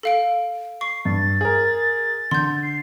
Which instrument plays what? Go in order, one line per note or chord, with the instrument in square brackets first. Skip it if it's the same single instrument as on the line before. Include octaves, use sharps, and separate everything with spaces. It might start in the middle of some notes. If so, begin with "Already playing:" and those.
[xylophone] A4 F5 D7
[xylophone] C#6 [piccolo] C7
[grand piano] G2 [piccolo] A6
[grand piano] G#4 A#4
[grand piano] D3 [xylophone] C6 G6
[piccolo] C7